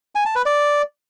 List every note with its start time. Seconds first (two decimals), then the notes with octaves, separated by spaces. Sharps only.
0.15 G#5
0.25 A5
0.36 B4
0.46 D5